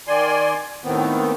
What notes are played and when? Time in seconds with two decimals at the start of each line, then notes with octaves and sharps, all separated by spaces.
0.07 D#3 D5 G#5 C6
0.84 D#2 A2 D#3 B3 C4